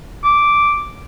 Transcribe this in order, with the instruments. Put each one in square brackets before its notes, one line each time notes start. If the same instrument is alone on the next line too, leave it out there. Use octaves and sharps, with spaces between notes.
[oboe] D6